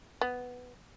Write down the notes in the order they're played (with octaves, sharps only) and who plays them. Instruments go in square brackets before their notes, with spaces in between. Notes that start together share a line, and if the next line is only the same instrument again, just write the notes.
[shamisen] B3